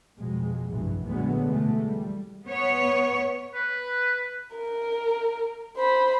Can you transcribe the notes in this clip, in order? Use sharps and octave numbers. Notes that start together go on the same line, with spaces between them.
F2 B2 G#3
F1 A#1 G2 B2 E3
A#2 D3 F#3 G#3 A3 B3
B2 E3 G#3 A3
G3
B3 C#5
B4
A#4
C5 B5